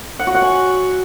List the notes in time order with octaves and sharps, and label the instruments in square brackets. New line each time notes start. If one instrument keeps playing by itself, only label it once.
[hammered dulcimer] F#5
F#4
F#5
G#5